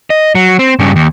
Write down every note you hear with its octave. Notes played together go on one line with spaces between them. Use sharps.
D#5
F#3
C4
G2 C#3
D#2